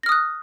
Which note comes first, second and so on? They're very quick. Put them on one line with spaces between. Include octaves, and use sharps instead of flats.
A#6 F6 D#6 F#6